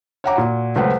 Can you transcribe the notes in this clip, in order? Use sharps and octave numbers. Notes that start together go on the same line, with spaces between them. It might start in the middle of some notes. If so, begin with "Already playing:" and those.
C#5 E5 F#5 G5 A#5 D6
A#2 F#4
C#2 F#3 A3 B4 C5 F#5